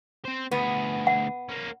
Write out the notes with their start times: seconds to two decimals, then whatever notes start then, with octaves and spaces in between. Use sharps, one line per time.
0.25 C4 C5
0.51 D2 B3 G#4
1.07 F#5
1.49 A#3 C#4